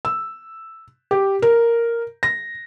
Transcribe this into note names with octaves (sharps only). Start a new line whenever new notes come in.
E6
G4
A#4
A#6